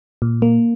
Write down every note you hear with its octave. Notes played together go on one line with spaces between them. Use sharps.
A#2
A#3